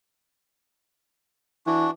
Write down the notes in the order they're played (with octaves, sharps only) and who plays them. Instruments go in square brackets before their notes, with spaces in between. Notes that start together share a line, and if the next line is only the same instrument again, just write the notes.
[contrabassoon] E3 [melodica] D4 F#4